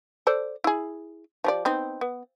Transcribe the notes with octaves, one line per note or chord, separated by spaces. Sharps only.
A4 C5 D5
E4 G#4
F3 G4 D5
B3 C4 D#4
B3